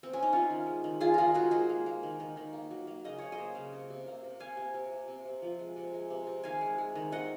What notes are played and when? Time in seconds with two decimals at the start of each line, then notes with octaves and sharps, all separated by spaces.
0.03 C4
0.13 C#4
0.23 D#4
0.32 C3 C#4 F4
0.50 D#3
0.66 G#3
0.84 D#3
1.00 D#3 F4 G#4
1.14 D#3 F4 G#4 A#4
1.34 G#3 F#4 A#4
1.51 G#3 G#4 C5
1.69 A#3
1.86 A#3
2.03 D#3
2.20 D#3
2.37 D#3
2.53 A#3
2.70 F#3
2.87 A#3
3.05 C#3 D#5
3.18 C#3 C#5
3.32 C5 D#5
3.38 A#3
3.55 C#3
3.72 C3
3.90 C3
4.07 A#3
4.23 C3
4.40 C3 F5 G#5
4.57 C3
4.74 C3
4.92 C3
5.08 C3
5.25 C3
5.42 F3
5.59 G#3
5.76 C3
5.93 G#3
6.10 C3
6.27 C3
6.44 D#3 F5 G#5
6.61 G#3
6.78 G#3
6.95 D#3
7.11 C3 D#5 F#5